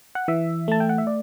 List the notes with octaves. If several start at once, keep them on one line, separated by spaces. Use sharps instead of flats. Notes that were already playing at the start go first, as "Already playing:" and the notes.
F#5
E3 E5
A3 A5
G5
F#5
E5
D5